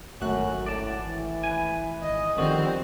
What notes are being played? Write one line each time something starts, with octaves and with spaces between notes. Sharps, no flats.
G#1 F#2 A3 F#4 F#6
A2 D5 A5
E3
B4 G#5
G#1 D#5
D3 D#3 F3 G3 C4 F#4